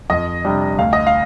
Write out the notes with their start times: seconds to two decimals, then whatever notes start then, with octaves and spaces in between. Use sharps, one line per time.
0.10 F2 D#5
0.45 C3 G3 D4
0.78 D2 F5
0.93 D#5
1.07 F5